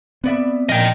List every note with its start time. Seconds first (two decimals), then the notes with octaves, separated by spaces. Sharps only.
0.24 B3 C4 D5 E5
0.69 A#2 F3 D#5 G5